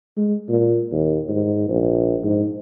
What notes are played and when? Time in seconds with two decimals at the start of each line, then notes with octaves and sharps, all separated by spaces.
0.17 G#3
0.49 A#2
0.92 D#2
1.29 G#2
1.69 A#1
2.24 G#2